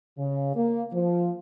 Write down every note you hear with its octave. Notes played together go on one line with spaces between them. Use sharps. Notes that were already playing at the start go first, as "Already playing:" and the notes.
C#3
A#3
F3